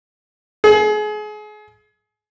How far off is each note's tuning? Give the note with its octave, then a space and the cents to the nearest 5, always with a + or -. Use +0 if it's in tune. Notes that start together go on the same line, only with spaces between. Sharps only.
G#4 +30